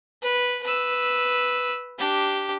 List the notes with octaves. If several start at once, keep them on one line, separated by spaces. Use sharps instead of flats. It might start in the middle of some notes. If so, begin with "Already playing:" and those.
B4
B4 E6
D4 G4